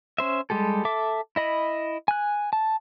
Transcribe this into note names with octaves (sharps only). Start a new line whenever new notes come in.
C#4 C5 E5
G3 G#3 G4 A4
A4 E5 D6
E4 D#5 B5
G#5 F#6
A5